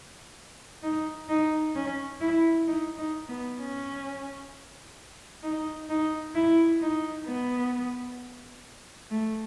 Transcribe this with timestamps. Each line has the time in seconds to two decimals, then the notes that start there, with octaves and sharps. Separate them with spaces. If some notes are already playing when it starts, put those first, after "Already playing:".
0.83 D#4
1.29 D#4
1.76 C#4
2.21 E4
2.68 D#4
2.98 D#4
3.29 B3
3.59 C#4
5.43 D#4
5.89 D#4
6.35 E4
6.82 D#4
7.27 B3
9.11 A3